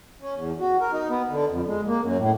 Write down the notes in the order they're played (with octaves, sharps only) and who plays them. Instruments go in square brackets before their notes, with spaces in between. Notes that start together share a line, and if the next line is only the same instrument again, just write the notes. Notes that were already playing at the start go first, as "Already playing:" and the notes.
[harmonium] C#4
E2
F#4
A#4
D#4
B3
D3
F2
G#3
A#3
F#2
A2